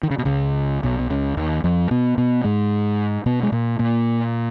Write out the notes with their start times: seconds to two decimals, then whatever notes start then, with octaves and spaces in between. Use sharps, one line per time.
0.03 D#3
0.11 C#3
0.18 B2
0.25 C#2 C#3
0.83 B1 B2
0.99 B2
1.10 C#2 C#3
1.37 D#2 D#3
1.64 F2 F3
1.91 B2 B3
2.18 B2 B3
2.44 G#2 G#3
3.26 B2 B3
3.43 G#3
3.52 A#2 A#3
3.79 A#2 A#3